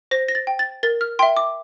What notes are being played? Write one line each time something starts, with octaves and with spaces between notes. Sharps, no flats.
C5 A#6
A#6
A6
G5
A6
A#4 A6
F6
E5 G5 C6
D6